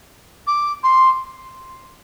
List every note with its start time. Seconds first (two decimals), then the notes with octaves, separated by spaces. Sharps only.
0.47 D6
0.83 C6